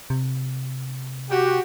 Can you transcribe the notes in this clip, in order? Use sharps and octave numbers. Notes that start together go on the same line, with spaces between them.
C3
F#4 G4